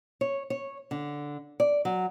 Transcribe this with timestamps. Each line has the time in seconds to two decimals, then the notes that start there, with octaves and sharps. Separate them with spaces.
0.21 C#5
0.50 C#5
0.91 D3
1.60 D5
1.85 F#3